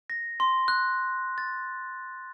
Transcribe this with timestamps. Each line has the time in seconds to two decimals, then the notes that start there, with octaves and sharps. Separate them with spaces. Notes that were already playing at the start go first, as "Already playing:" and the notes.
0.10 A#6
0.40 C6
0.68 F#6
1.38 A6